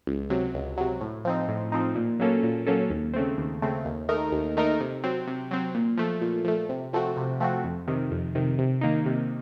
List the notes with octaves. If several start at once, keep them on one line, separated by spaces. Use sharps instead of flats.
C#2
C3 F#3
C#2
C3 F#3
A2
F3 C4 D#4
A2
F3 C4 D#4
A#2
F#3 A#3 C#4 A4
A#2
F#3 A#3 C#4 A4
D#2
C#3 A3 C4
D#2
C#3 A3 C4
D#2
D#3 A3 D#4 A#4
D#2
D#3 A3 D#4 A#4
C3
F#3 C4
C3
F#3 C4
A#2
F3 A3
A#2
F3 A3
C3
F3 A3 C4 F#4
C3
F3 A3 C4 F#4
F2
C3 D#3
F2
C3 D#3
C3
D#3 A#3 D#4
C3